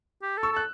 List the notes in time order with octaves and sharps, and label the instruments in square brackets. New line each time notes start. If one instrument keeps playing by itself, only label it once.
[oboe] G4
A4
[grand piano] C#6 E6
[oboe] A4 [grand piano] F#6